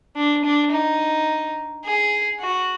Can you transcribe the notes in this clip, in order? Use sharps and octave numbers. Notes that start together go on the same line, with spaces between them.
D4
D4
D#4
G#4
F#4